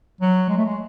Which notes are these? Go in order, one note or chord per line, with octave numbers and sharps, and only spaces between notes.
F#3
G#3
A3
G#3